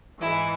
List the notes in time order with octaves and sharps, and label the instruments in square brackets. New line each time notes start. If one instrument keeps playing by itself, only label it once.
[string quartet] G#2 E3 G#3 E4